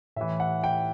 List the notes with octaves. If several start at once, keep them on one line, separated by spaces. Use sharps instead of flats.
A2 E3 E5
F#5
G5